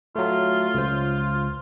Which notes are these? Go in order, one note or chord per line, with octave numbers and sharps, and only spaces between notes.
F#3 A3 F4
C#2 C5